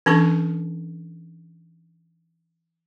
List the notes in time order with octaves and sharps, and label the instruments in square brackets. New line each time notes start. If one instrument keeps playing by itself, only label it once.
[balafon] E3 C#4 D4 A4 C#6